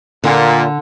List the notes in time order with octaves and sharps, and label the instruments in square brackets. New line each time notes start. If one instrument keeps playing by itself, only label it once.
[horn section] A#2 [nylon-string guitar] D3